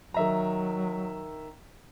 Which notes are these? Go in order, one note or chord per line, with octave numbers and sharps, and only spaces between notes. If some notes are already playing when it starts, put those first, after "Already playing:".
D#3 F#3 E5 A#5